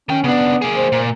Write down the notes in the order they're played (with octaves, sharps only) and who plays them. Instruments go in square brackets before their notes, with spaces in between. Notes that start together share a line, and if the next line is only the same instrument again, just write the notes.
[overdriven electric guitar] D#3 G5 [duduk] C#4
[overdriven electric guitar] C#3 D4 [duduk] B3
[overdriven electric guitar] A#3 G#4
[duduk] C5
[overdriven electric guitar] A#2